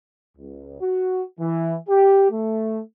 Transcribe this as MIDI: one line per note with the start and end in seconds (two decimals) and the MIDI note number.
0.37 0.79 37
0.81 1.24 66
1.39 1.76 52
1.89 2.29 67
2.31 2.80 57